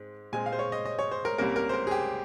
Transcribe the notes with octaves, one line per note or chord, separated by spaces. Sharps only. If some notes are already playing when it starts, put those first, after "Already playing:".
Already playing: G#2 G#3 C4
A#2 G#3 C4 G#5
F5
C5
C#5
D#5
D#5
C#5
C5
A#4
C2 C3 G3 A#3 C#4 A#4
A#4
C5
A#4
G#4
G4